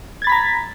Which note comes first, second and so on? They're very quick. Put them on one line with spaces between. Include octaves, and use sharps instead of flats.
G#6 A6 B5 B6 A#5